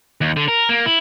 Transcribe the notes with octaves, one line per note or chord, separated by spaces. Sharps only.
D#2
D3
A#4
A#3
E4